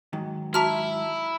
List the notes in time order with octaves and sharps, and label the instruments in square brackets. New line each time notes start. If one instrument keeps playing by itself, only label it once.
[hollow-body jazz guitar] G#2 D#3 F#3
[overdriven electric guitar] E4 [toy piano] F#4 A5 D6 [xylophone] E5 A#5 F6